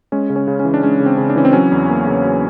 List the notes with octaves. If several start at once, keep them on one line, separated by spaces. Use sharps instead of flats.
G#3 C#4
C#3
C#4
C#3
C#4
E3
D4
G#3 C#4
C#3
C4
C#3
D4
E3 C#4
C4
F#3 C#4
E2
A#3
C#3
F#3